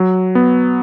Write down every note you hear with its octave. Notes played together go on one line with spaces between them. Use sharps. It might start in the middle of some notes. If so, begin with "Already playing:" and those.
Already playing: F#3
B3